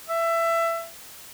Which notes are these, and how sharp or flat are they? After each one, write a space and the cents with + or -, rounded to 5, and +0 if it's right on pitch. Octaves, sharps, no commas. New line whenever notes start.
E5 +20